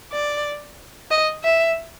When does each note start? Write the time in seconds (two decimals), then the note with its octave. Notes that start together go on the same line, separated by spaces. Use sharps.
0.12 D5
1.11 D#5
1.44 E5